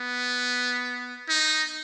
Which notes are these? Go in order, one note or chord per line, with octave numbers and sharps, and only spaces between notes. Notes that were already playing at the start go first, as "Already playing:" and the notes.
Already playing: B3
D#4